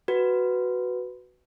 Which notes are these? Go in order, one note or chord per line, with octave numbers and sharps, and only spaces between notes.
F#4 B4